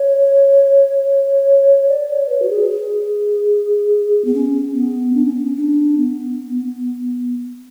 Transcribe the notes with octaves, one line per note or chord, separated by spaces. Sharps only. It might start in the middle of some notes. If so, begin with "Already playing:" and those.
Already playing: C#5
D5
C#5
B4
F#4
G#4
G#4
B3
C#4
B3
D4
C#4
B3
C#4
D4
B3